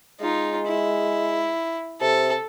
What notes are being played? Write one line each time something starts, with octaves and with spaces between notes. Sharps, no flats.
G#3 D#4 F4
E4
C3 A4